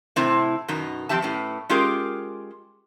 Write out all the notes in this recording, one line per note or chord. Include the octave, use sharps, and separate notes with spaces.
A2 C3 C4 E4
F#2 B2 D#3 D#4
F3 C4 G4 E5 A5
A2 B3 C#4
G#3 C#4 F4 G4 G#4 A#4